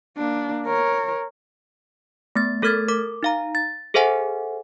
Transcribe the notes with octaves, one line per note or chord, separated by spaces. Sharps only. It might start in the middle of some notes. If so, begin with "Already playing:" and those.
A#3 D4
A#4 C#5
A3 B3 A6
A3 A4 A#4 F6 G#6 A6
A#4 D6
D#4 F5 A#5
A6
G#4 A4 C5 E5 F#5 G#5